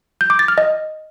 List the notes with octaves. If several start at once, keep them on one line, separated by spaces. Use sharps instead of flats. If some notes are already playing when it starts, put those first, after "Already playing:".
G6
D6
A6
F6
D#5